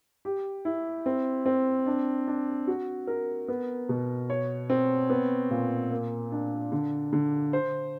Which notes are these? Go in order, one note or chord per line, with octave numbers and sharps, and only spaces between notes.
G4
E4
C4
C4
D4
D4
F#4
A#4
B3
B2
C#5
C4
B3
A#2
A#3
D4
D3
D3
C5